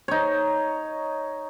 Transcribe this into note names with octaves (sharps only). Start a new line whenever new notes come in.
D#4 C#5